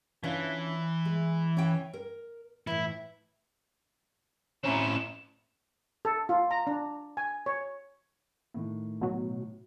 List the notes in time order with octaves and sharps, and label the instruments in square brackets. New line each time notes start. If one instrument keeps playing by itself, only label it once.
[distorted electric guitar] E3 [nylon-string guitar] C#4 D4 F4
[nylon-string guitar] G#3
C#4 G5
A#4
[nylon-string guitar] A2 E3 [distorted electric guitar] E4
[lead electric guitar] A2 C4 [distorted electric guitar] C#4 E4 [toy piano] C#5 A#5 D6 [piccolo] E7
[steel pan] A4
F4
A#5
D4
G#5
C#5
[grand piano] A2 D#3
[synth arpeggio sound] B2 F#3